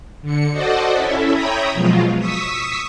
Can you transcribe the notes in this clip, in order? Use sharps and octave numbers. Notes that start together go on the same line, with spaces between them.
D3 C#7
F#4 A4 C5 D5 D#5 F#5
C#4 E4 A4 E5
C#5 E5 G5 A#5 B5 D#6
B2 F3 F#3 G#3 F4
C#6 D#6 E6 B6